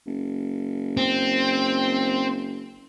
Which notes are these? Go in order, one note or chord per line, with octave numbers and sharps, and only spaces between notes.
F#1
C4